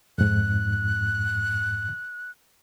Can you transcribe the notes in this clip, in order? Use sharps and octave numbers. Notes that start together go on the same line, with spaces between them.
F2 G#2 F#6